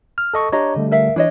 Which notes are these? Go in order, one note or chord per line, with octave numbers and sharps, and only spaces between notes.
F6
A4 D#5 C#6
D4 G4 C#5 D#5 A#5
D3 G3 A3
A#4 E5 F5
E3 D4 C#5 D#5